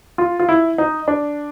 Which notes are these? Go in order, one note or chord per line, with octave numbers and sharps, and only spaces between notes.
F4
F4
E4
D#4
D4